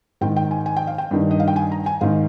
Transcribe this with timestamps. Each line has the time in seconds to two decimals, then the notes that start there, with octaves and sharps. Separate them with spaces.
0.21 G#2 D#3 G5
0.37 G5
0.51 G#5
0.66 G#5
0.77 G5
0.87 F5
0.98 G5
1.11 G2 D#3
1.31 D#5
1.40 F5
1.48 G5
1.56 G#5
1.72 A#5
1.86 G#5
2.01 G#2 D#3 F5